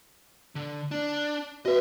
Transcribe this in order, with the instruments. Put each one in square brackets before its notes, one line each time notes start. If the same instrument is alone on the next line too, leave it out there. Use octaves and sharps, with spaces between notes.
[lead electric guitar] D3
D4
[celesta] F#4 B4 [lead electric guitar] D#5 E5